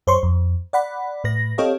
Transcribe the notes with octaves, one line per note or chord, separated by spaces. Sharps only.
F#2 C5 C#5 C6 C#6
F2
D5 F#5 B5
A2 B4 A#6
C4 G4 A4 C#5 D#5 F5